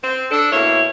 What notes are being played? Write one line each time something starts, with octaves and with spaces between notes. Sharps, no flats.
C4
D4 A4
B2 A#3 E4 C#5